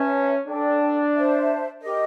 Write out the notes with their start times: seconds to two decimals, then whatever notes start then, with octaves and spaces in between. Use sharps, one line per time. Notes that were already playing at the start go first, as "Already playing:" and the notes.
Already playing: C#4 B4 E5 A5
0.47 D4 A4 D5 G5
1.14 C5 E5 A5
1.81 G4 A#4 D#5